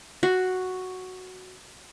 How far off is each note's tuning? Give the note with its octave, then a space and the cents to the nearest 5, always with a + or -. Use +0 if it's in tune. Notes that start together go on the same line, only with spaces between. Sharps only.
F#4 +0 C6 +0